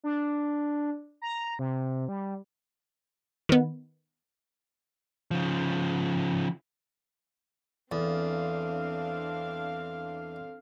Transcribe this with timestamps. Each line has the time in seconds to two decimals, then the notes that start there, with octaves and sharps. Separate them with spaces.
0.04 D4
1.22 A#5
1.59 C3
2.08 G3
3.49 D#3 B3
5.31 C#3 F3
7.92 E2 C4 D4 A4 F5